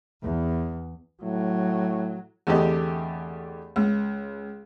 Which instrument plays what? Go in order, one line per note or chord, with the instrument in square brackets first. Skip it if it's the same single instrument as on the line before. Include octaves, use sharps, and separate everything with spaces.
[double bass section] E2
[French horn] A2 [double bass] F#3
[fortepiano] E2 D3 A3 C4 G4 D#5
C#2